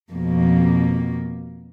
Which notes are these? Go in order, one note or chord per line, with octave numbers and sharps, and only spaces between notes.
F2 B2 A#3